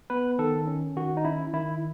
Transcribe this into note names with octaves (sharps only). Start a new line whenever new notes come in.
B3 B4
D#3 A4
C#4
D#3 F#4
D#4
C#4 E4
D#3 E4